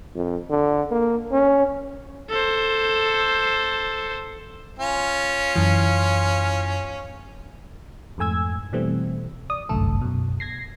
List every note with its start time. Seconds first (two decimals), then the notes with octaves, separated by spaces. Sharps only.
0.16 F2
0.50 D3
0.91 A#3
1.32 C#4
2.29 A4 C5
4.79 C#4 F4
5.56 F#2 E3
8.18 F2 G#2 A3 G#5 E6 G#6
8.73 B2 E3 G3 A3 C4
9.50 D5 D#6
9.69 G1 C2 F#2 D3 A3 A4
10.02 F#2 B2
10.40 G#6 A#6 C7